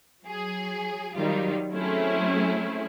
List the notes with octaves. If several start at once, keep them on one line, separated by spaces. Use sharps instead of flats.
F#3 G#4
D#3 F#3 G3 D#4 F4
F#3 A3 C4 C#4 E4 G#4